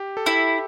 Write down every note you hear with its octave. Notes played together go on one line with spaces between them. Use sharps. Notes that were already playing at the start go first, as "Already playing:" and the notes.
Already playing: G4
A4
E4 G4